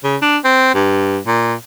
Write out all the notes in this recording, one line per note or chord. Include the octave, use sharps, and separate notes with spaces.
C#3
D4
C4
G2
A#2